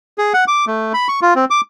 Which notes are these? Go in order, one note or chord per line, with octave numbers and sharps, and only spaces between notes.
G#4
F#5
D6
A3
B5
C#6
F4
C4
D6